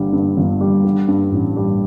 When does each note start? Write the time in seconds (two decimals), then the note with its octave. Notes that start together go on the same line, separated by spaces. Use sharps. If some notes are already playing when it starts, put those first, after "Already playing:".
Already playing: G1 G2 D3 G3
0.13 G2
0.37 G1
0.61 G3
0.85 D3
1.08 G2
1.32 A1
1.56 G3